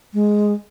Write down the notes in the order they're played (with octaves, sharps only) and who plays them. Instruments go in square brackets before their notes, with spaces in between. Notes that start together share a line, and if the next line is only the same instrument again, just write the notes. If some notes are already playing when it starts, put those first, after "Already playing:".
[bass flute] G#3